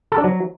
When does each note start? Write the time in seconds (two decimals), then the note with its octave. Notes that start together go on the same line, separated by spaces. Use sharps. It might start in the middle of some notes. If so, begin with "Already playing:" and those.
0.12 A4
0.18 D4
0.24 F#3